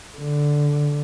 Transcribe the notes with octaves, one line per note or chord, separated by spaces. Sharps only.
D3